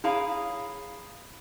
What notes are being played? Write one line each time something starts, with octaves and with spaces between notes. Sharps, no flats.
E4 G#4 C#5 F5 A#5